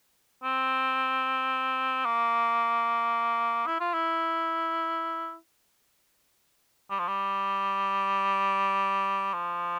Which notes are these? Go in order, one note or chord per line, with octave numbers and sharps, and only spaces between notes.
C4
A#3
E4
F4
E4
G3
F3
G3
F3